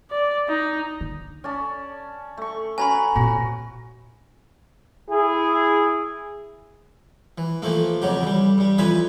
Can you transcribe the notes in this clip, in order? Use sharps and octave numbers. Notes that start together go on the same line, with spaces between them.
D5
D#4
D3
C#4 D5 A5
A3 C#6
C#4 F#4 B4 G#5 A#5 B5
A#2 C4 F#4
E4 G#4
E3
E3 F3 A3 A#3
F2 C#3 F#3 G4
E3 G3
G2 G3
F2 E3 F3 B4 E5 G#5